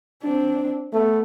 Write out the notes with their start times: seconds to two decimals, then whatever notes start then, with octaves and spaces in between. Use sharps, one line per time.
0.23 C4 D4
0.93 A3 B3